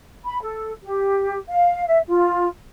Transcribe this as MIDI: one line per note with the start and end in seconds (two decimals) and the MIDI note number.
0.24 0.41 83
0.42 0.71 69
0.82 1.38 67
1.49 1.86 77
1.86 2.00 76
2.07 2.46 65